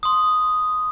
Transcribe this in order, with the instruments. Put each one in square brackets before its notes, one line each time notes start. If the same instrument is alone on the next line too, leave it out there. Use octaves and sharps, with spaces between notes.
[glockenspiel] C6 D#6